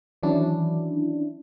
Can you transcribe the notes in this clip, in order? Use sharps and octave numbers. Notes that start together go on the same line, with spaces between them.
D#3 E3 F#3 C#4 D4 E4